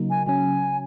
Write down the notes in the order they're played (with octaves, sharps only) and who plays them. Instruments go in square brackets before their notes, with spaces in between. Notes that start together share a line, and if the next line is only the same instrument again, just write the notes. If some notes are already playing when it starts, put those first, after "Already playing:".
Already playing: [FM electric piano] C#3 F#3 A#3 D#4
[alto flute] G#5
[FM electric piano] C#3 F#3 C#4 [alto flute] G#5